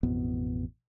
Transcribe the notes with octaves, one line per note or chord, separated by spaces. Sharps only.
A1 F2 B2 B3